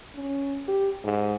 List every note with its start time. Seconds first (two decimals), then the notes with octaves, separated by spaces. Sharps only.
0.15 C#4
0.68 G4
1.04 G#2